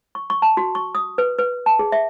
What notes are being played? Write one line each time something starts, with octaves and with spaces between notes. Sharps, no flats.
C#6
C#6
A5
F#4
C#6
D#6
B4
B4
A5
G#4
E5